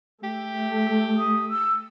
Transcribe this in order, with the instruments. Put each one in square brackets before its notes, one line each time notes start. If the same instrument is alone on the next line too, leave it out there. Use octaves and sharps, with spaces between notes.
[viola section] A3 [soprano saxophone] G4
[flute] D#6
E6